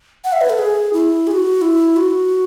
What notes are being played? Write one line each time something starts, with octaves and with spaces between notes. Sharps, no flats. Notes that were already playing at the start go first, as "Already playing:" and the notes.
F#5
E5
B4
A4
G#4
E4
G#4
F#4
E4
F#4